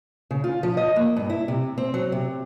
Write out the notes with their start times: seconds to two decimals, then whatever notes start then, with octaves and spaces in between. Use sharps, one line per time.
0.31 C#3
0.44 F4
0.63 F3
0.77 D#5
0.96 A#3
1.17 G2
1.30 E4
1.48 C3
1.78 C4
1.94 F#3
2.12 C3